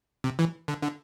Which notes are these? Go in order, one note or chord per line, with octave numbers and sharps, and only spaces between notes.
C3
E3
D3
D3